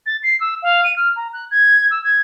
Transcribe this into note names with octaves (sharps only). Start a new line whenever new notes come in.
A6
C7
E6
F5
D#7
F6
A#5
F#6
G#6
E6
G#6